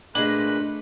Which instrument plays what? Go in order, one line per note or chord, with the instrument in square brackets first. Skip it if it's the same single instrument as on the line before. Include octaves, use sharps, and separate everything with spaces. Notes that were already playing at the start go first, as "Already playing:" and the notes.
[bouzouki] A#2 G#3 [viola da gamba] A3 [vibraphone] D4 [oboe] B4